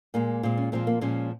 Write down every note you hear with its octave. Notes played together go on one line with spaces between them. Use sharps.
A#2 G#3 A#3
A#2 G#3 C4
C#4
A#2 F3 G#3 C4
A#3
A#2 F3 G#3 C#4